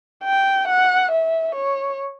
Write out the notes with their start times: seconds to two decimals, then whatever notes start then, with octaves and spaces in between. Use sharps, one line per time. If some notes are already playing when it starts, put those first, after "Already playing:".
0.24 G5
0.68 F#5
1.11 E5
1.55 C#5